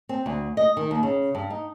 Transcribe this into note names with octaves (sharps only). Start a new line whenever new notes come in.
C4
D2
D#5
D#3
D#2
C#3
G2
D#4